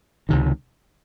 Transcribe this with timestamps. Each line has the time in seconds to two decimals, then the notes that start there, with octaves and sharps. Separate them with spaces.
0.29 C#2 C3 D#3